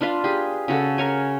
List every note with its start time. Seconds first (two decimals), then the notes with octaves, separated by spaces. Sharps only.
0.01 D4 F4 B4 F5
0.24 G4 G#4
0.68 C#3 F#4 A4
0.98 A#4 C#5 G#5